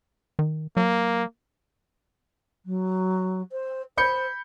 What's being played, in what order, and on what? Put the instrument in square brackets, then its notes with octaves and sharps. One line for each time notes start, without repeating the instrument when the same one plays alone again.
[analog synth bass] D#3
[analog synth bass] F#3 [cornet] A#3
[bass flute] F#3
C5
[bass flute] C5 [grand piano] B5 G6 C#7